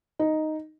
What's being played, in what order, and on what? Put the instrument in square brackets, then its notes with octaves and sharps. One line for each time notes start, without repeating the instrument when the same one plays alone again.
[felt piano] D#4